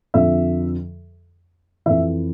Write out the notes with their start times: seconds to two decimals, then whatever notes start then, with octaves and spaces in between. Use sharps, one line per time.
0.14 F2 D3 F3 E5
1.86 F2 E3 E5